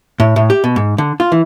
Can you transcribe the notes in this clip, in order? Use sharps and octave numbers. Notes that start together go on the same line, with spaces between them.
A2
A2
G4
B2
G#2
D3
F4
E3